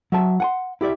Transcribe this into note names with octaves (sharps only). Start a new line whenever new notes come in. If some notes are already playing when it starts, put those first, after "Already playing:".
F#3 E5 A5
F#5 G#5 C6
E4 G4 D5 E5